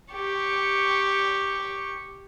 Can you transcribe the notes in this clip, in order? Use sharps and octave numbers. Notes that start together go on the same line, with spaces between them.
G4 C#6